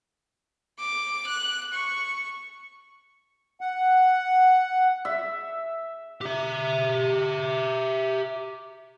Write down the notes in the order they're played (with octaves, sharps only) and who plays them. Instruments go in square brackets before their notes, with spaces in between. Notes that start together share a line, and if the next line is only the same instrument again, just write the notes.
[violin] D6
F#6
C#6
[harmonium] F#5
[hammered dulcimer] E5
[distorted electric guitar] G4 E5